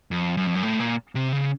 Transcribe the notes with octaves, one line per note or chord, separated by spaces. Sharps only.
F2
F#2
F2
F#2
A2
A#2
C3
C#3